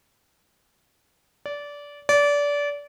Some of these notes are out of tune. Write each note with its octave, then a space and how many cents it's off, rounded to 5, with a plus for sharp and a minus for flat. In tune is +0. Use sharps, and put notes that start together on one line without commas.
D5 -20
D5 -25